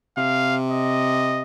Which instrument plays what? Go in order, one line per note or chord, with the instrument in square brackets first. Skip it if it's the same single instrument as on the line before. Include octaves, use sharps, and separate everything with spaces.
[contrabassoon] C3 [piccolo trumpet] F5
[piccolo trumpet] D#5